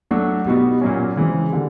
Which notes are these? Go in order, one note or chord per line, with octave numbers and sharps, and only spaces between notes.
F#3 A3 D4 F#4
B2 G3 B3 D#4 F#4
A#2 F#3 A#3 C#4
C#3 E3 G#3 C4
D3 G3